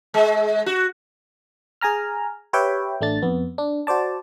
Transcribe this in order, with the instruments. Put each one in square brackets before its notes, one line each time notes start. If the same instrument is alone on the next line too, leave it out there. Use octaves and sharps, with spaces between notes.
[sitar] G#3
F#4
[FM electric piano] G#4 G#5 A#5 F6
G4 B4 C#5 E5 G5
A1 A3 D4 A6
F2 B3
D4
F#4 C5 D5 A5